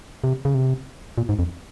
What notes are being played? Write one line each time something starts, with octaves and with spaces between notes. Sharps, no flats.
C3
C#3
C3
A#2
G#2
F2